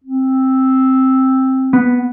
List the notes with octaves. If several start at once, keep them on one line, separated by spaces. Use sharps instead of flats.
C4
B3